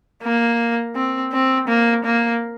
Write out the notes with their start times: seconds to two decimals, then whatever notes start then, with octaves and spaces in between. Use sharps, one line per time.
0.23 A#3
0.95 C4
1.32 C4
1.68 A#3
2.04 A#3